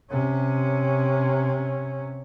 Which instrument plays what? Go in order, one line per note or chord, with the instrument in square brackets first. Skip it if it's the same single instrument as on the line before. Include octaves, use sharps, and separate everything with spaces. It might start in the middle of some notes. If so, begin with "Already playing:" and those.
[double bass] C3 C#4